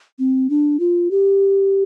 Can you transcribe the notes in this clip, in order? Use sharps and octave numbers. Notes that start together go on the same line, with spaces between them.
C4
D4
F4
G4